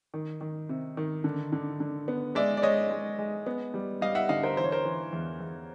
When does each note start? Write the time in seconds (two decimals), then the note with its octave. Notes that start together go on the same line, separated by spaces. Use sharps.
0.14 D#3
0.41 D#3
0.69 C3
0.97 D#3
1.24 D3
1.52 D3
1.80 D3
2.08 B3
2.35 G#3 D5 E5
2.57 D5
2.62 G#3 C#5 D#5
2.90 G#3
3.19 G#3
3.46 B3
3.74 G3
4.01 G3 D#5 F5
4.15 E5 F#5
4.29 D3 D#5 F5
4.43 A#4 C5
4.57 E3 C5
4.64 C#5
4.72 A#4 C5
4.85 E3
5.12 E2
5.40 E2